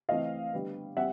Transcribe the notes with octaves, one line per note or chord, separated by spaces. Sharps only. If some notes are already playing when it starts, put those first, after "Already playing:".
E3 A3 C4 D#5 F5
D3 G3 B3
G3 C4 E5 F#5